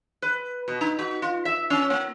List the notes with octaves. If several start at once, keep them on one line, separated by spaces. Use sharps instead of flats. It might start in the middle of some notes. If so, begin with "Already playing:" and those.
B4
B2
D#4
F#4
F4
E5
C#4
A#3